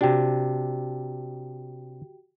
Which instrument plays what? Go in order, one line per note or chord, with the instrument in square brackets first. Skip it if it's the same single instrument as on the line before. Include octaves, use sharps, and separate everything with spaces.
[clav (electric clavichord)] C3 D4 [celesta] F#4 G4 G5